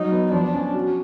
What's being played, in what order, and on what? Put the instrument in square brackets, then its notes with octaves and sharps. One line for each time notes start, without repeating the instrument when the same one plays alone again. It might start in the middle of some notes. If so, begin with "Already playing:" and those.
Already playing: [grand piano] F#3 [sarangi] D#4
[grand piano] B3
[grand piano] F3 [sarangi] D4
[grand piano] C#4
F#4